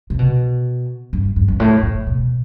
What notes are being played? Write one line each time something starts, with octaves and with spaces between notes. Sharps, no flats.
C3
B2
G2
G2
G2
A2
A2
B2